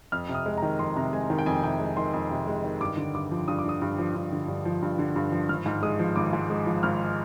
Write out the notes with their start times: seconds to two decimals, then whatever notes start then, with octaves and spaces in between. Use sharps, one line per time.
0.12 F2 F6
0.29 C3
0.34 D#6
0.46 G#3
0.57 D#3 A#5
0.79 F2 C6
0.96 C3 A#5
1.13 G#3 G#5
1.30 D#3
1.39 G5
1.46 F2 G#5
1.63 C3 G5
1.80 G#3
1.97 D#3 C6
2.13 F2
2.31 C3
2.47 G#3
2.64 D#3
2.81 G2 D6
2.97 D3
3.15 G2 D6
3.31 F3
3.48 G2 D#6
3.59 D6
3.65 D3 D#6
3.82 G2
3.98 F3
4.15 G2
4.32 D3
4.48 G2
4.65 F3
4.82 G2
4.99 D3
5.16 G2
5.32 F3
5.49 G#1 F6
5.66 G#2
5.83 G#3 D#6
5.99 F3
6.16 G#1 D6
6.33 G#2
6.50 G#3
6.66 F3
6.83 G#1 F6